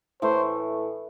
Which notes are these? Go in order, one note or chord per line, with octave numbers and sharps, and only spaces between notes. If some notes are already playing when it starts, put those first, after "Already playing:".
A2 E3 A3 C5